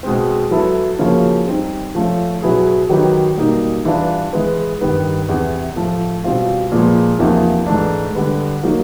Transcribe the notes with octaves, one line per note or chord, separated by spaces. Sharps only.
B2 G#3 C4
F#3 B3 E4 A4
C#3 F3 A#3 C#4 F#4
G3 C4 D#4
F3 A3 C#4 F4
B2 F#3 B3 E4 G#4
D#3 F#3 B3 D#4 G4
B2 G3 A#3 D#4
E3 G3 B3 D4 F4
E3 G#3 B3
G2 D#3 G3 B3 D#4
E2 C3 E3
A2 F3 A3
B2 G3 C4 F4
A#2 F3 G#3 B3
E2 C3 F3 A#3 D#4
G#2 E3 A3 D4
D3 G3 B3
F#3 A#3 D#4 F#4